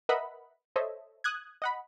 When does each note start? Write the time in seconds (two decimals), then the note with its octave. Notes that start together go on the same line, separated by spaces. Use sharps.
0.09 A#4 B4 D#5 E5 F#5 B5
0.76 A4 C5 C#5 D#5 E5
1.24 D#6 F#6 G#6
1.62 D#5 F#5 B5